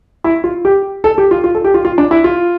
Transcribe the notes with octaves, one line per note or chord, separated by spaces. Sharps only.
E4
F4
G4
A4
G4
F4
F4
A4
G4
F4
F4
D4
E4
F4